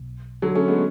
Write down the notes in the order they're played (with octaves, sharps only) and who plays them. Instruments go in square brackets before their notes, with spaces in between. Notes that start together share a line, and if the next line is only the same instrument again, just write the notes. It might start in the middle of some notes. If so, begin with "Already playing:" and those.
Already playing: [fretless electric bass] B1
[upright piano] D3 F#3
A3 C#4
G#3 B3